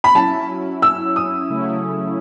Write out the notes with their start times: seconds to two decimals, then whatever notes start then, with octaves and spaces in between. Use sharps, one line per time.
0.04 B5
0.15 F#3 C#4 E4 A5
0.82 E6
1.16 D#6
1.50 C#3 F#3 A3 C#4 E4